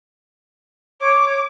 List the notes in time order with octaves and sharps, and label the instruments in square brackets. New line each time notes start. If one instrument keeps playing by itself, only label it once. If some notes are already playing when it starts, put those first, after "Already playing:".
[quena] C#5 [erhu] D6